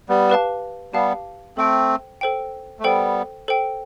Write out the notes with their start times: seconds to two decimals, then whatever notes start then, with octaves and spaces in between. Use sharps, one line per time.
0.09 G3 B3
0.30 G4 B4 F5 A5
0.93 G3 B3 G4 B4 F5 A5
1.57 A3 C4 A4 C5 G5
2.21 A4 C5 G5
2.80 A3
2.84 G3 B3 A4 C5 G5
3.48 A4 C5 G5